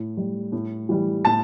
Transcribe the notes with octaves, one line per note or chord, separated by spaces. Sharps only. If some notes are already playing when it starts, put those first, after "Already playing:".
Already playing: A2
G3
A2
E3 G3
A2 A5